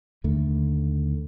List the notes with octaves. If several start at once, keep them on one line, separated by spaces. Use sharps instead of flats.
D#2 D3 A3